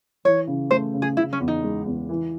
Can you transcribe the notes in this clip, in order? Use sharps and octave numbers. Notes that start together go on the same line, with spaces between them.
E3 C#5
C#3
A3 C5
C#3
G#4
C#3 E4
C#4
E2
D#4
G#3
E2
E3